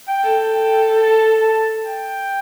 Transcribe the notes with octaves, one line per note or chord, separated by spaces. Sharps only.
G5
A4
G5
A5
A5
G5